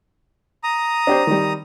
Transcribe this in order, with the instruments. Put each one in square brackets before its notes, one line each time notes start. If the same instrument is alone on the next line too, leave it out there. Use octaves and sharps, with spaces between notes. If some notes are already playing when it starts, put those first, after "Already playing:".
[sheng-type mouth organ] A#5 D#6
[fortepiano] D4 G4 C5
D#3 G3